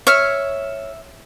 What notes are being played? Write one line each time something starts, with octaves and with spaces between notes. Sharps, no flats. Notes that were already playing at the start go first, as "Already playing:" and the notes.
C#5 E5 F6